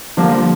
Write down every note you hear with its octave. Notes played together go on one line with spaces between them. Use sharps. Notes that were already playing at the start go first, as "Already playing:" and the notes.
D3 F3 G3 A#3 D4